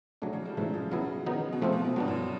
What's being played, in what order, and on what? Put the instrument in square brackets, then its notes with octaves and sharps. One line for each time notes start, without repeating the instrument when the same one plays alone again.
[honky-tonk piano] C#3 [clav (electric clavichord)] F#3 A3 D4
[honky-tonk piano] C#3
G3
[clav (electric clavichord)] G#2 E3 A3 [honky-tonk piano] F#3
[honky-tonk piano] F3
[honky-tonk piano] C#3 [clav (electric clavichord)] F#3 B3 E4
[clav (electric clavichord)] D#3 F#3 B3 D#4
[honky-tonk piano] B2
[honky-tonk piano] C3 [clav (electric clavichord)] F3 A3 C4 F4
[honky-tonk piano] B2
B2
[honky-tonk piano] G2 [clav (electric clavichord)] F#3 B3 D4
[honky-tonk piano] F#2